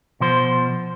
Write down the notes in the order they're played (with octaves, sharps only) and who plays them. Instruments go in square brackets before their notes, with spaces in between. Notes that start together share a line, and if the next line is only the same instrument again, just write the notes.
[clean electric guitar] B2 F3 C5